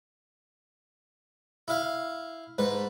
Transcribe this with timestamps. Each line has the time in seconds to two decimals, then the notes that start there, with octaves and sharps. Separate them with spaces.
1.68 E4 F5
2.58 G#2 B4